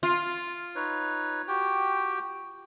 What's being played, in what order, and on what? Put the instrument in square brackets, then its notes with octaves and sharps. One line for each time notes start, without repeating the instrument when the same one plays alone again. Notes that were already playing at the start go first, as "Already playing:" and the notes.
[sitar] F4
[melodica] D#4 B4 C#5
F#4 G4 G5